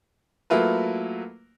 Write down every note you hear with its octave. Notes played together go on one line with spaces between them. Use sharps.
F#3 A3 A#3 E4 F4 B4